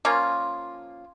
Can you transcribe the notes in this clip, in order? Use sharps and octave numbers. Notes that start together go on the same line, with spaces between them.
F3 A#3 C#4 F4